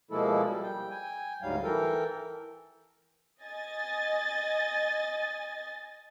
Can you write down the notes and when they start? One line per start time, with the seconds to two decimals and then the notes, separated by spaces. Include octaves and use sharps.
0.11 B2 F3 G#3 A#3 E4 A4
0.44 G3
0.63 G5
0.91 G5 G#5
1.42 D2 G#2 F#3 G3 F5
1.63 E3 A4 A#4 G5
3.41 D#5 G#5 A6